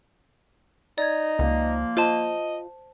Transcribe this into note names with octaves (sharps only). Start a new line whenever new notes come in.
D#4 D5 G#6
C#2 F3 A#3
F4 C5 D#5 A5